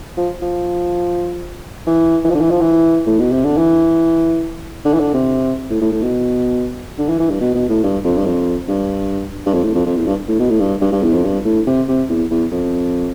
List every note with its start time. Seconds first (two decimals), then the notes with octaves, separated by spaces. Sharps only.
0.17 F3
0.42 F3
1.87 E3
2.24 E3
2.30 F3
2.35 D3
2.40 E3
2.50 F3
2.61 E3
3.06 A2
3.19 B2
3.32 C3
3.45 D3
3.57 E3
4.85 D3
4.94 E3
4.99 D3
5.14 C3
5.70 A2
5.81 A2
5.92 A2
6.02 B2
6.98 D3
7.09 E3
7.19 E3
7.30 G2
7.41 B2
7.54 B2
7.69 A2
7.83 G2
8.04 F2
8.17 G2
8.26 F2
8.68 G2
9.46 G2
9.53 F2
9.64 A2
9.75 F2
9.86 F2
9.96 E2
10.06 G2
10.28 A2
10.39 B2
10.50 A2
10.60 G2
10.81 G2
10.92 G2
11.02 E2
11.13 F2
11.24 G2
11.45 A2
11.67 C3
11.88 C3
12.09 E2
12.31 E2
12.51 F2